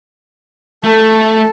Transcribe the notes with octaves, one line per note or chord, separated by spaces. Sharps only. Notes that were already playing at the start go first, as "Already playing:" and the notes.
A3 A4